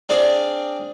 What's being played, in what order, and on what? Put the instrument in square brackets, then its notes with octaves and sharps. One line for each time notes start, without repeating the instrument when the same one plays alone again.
[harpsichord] C4 D4 G#4 D5 F5